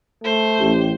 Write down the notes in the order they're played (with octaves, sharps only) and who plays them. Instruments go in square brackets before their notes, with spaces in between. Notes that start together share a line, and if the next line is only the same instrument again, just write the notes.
[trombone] A3 [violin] C5
[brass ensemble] A1 G4